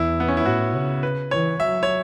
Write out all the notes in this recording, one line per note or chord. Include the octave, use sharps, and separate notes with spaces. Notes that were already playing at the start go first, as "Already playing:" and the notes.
Already playing: E2 E4
B3
C#4
E4
A2 F#4
C#3
B4
E3 C#5
F#3 E5
C#5